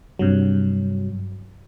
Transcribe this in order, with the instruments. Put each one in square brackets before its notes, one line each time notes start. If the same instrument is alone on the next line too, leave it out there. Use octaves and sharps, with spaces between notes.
[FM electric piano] G2 C3 F#3